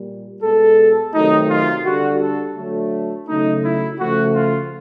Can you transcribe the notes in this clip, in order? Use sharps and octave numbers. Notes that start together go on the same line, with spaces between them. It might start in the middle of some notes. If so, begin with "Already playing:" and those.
Already playing: A#2 G3
B2 G#3 A4
C3 D#3 F#3 A3 D#4
F4
D3 G3 F#4
A4
D3 F#3 A3
C#3 F#3 A3 D#4
E4
C#3 F3 A3 F#4
F4